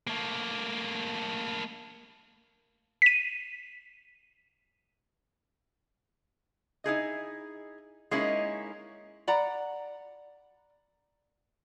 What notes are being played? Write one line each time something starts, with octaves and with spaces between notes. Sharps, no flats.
A3 A#3
B6 D#7
D#4 E4 G#4 D#5
G#3 A#3 C#4 D#4 E4 A#4
D5 F#5 A#5 B5